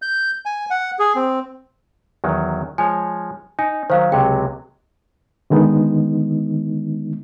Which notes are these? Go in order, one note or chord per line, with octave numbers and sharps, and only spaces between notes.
G6
G#5
F#5
G#4
C4
E2 D#3 F#3
F3 G#3 C#5 G#5
D#4 G#5
D#3 F#3 C5 F5
C#2 C3 F#3 G5
D3 D#3 G#3 B3 D#4